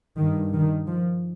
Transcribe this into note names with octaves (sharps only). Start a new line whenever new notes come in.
G2 D#3
D#3
F3